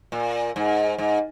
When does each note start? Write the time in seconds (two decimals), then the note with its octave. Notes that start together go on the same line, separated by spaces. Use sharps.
0.12 A#2
0.56 G#2
0.98 G#2